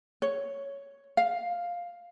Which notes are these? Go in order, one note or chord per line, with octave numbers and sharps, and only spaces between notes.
C#5
F5